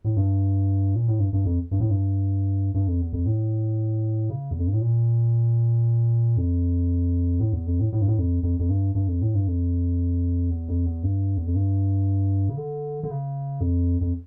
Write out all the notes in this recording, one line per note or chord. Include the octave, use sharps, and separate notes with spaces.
A2
G2
A#2
A2
G2
G2
F2
G2
A2
G2
G2
F2
E2
F2
A2
C#3
E2
F2
G2
A2
A#2
F2
A2
E2
F2
A2
A2
G2
A2
F2
F2
F2
G2
G2
F2
A2
G2
F2
E2
F2
E2
G2
E2
F2
G2
C#3
D3
D3
C#3
F2
F2